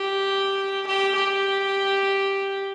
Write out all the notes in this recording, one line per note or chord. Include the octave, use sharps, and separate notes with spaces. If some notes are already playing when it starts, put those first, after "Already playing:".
Already playing: G4
G4
G4